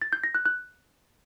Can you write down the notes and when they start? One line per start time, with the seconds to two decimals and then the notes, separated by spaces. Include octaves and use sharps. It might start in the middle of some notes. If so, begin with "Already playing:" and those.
0.02 A6
0.13 G6
0.24 A#6
0.35 F#6
0.46 F#6